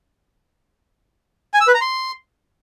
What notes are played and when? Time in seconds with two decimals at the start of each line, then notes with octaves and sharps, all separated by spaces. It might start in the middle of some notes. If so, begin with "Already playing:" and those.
1.54 G#5
1.61 E6
1.68 B4
1.74 A#5
1.81 C6